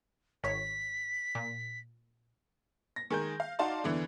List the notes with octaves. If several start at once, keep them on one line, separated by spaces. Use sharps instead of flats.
G#1 C#5 B6
A#2
A#6
D#3 G#3 G#4 A#4 G6
F5
D#4 F#4 D5 F5 A5 C6
E2 D3 E3